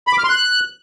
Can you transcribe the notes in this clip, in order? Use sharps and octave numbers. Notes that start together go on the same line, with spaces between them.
B5
D6
F6
C6
F#6